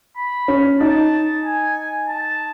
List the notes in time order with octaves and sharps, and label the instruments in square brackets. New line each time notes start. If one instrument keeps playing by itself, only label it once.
[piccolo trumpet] B5
[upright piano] C#4
[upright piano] D#4 [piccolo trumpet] A5
[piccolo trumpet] G#5
A5